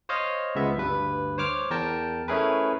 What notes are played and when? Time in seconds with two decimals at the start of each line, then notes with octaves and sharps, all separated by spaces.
0.09 C5 C#5 D#5 F5
0.55 C#2 G#3 B3 E5
0.78 D2 G2 B4
1.38 C5 C#5 D6 F6
1.70 E2 A#4 G5 A5
2.28 A3 C#4 E4 G#4 A#4 B4